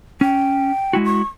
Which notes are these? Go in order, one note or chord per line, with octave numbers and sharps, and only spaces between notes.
C#4 G5
G#3 E4 F#4
C#6